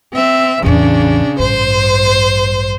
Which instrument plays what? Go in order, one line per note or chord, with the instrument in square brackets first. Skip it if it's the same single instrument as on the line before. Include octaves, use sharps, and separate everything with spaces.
[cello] C4 E5
[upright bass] A1 E2 [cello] C#3 D4
[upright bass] A1 G2 [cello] C5